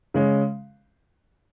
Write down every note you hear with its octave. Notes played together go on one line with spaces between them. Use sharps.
C#3 G#3 C#4